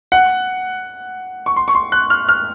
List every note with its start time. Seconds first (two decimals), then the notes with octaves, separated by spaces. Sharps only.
0.12 F#5
1.46 C#6
1.56 C6
1.68 C#6
1.75 C6
1.92 F#6
2.10 F6
2.29 F6